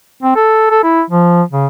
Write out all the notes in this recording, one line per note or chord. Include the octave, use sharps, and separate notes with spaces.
C4
A4
A4
E4
F3
C#3